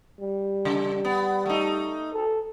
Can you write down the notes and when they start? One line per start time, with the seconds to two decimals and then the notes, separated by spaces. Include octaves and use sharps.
0.21 G3
0.65 C#3
1.05 B3
1.46 A3 D#4
2.13 A4